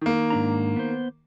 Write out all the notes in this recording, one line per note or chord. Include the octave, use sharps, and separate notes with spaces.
D#3 A#3
G#2 D4 A#5
B3 C5